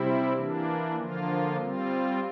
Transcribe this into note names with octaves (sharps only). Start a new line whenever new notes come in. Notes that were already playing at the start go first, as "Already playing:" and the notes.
Already playing: C3 G3 C4 E4
E3 A#3 D4
D3 F3 A#3 F4
G3 C4 F4